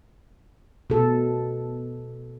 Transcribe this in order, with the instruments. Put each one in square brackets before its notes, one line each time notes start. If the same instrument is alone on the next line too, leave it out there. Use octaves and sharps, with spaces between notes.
[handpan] B2 A4